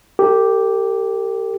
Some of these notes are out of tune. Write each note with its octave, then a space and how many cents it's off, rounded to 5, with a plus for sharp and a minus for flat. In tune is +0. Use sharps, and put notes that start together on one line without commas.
G4 +0 A#4 -45